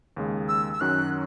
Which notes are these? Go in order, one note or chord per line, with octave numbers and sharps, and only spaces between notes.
D#2 C#3 G#3
E6
E6
F#2 D#3 F#3 C#4 F#6